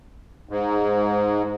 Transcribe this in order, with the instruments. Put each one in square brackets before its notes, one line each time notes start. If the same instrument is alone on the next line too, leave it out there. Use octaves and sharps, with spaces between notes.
[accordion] G#2